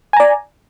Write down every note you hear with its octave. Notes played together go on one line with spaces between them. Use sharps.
D5 G#5 A#5